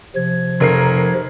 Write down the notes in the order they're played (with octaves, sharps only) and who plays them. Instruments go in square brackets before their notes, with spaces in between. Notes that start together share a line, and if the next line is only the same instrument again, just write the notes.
[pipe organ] C3 F3 G#6
[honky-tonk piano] F1 A#4 C7